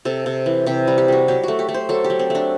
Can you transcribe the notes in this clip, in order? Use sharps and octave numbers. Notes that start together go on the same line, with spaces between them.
C3 A4
C3
E3
C3 G4
G3
G4
G3 F#4
F#3 G4
A3 F#4
G4
A3
C5
F#3 A4
G4
F#3
C4
A3 D4